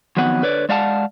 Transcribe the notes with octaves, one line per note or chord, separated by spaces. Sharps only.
F2 D#3 F#3 B3 F#5
D3 B4 C#5 D5
G#3 D5 F5 F#5 A5